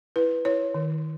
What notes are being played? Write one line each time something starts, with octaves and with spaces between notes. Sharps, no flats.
E4 B4
E4 C#5
D#3